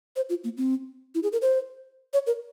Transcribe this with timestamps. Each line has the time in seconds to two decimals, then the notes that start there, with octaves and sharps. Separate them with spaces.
0.16 C5
0.29 F4
0.44 A#3
0.57 C4
1.15 E4
1.23 G#4
1.32 A#4
1.42 C5
2.13 C#5
2.27 A#4